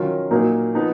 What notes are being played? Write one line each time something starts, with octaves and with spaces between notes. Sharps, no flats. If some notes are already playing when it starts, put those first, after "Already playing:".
Already playing: D#3 F#3 C#4 F4 A#4
A#2 F#3 A#3 D#4 A#4
F3 B3 D#4